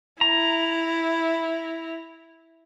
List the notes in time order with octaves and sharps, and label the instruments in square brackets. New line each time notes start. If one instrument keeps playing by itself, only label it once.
[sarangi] E4 [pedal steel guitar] A#5